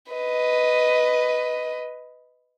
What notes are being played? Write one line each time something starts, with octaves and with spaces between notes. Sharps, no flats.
B4 D#5